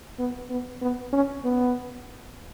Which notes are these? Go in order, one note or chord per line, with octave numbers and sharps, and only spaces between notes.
B3
B3
B3
C#4
B3